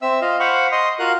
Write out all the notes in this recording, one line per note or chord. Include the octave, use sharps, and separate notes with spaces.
C4 E5 E6
F4 D#5 F5
C5 F5 F#5 B5 C#6
D#5 C6 D#6
F4 F#4 A#4 F5 F#6